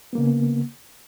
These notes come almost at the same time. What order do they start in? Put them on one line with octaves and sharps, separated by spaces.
B3 A#3 C#3